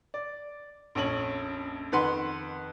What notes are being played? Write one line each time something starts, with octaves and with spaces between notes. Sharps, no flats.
D5
A#1 F2 C#4 F#7
F2 D#3 B4 F#5 C6